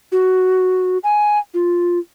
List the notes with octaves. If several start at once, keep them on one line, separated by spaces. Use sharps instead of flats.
F#4
G#5
F4